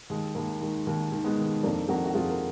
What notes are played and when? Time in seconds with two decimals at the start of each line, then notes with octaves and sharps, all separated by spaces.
0.10 D#2 G#3
0.35 D#2 A#3
0.61 D#3 G#3
0.87 D#2 A#3
1.12 D#3
1.24 G#3 B3
1.38 D#3
1.63 F2 A#3 D4
1.88 F2 F#4 A#4
2.05 F#4
2.14 F2 F4 G#4
2.30 A#4